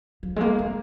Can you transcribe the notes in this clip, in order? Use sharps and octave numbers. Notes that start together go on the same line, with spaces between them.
F3
G#3
A#3
A#3